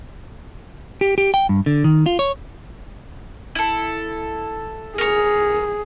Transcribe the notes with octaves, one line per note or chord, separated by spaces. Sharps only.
G4
G4
G5
G2
D3
D#3
F4
C#5
E4 A4
G#4 A#4 C#5